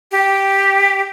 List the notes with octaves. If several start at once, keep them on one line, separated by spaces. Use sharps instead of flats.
G4